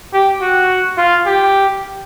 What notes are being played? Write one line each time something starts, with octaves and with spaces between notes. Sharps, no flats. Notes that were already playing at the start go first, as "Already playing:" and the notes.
G4
F#4
F4
G4